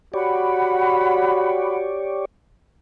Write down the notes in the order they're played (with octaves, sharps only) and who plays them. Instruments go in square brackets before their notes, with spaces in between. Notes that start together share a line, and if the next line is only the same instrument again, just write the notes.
[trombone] F#4 [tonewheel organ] G4 C#5 D5 [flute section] F#5 B5